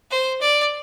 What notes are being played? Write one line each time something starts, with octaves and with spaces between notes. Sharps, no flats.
C5
D5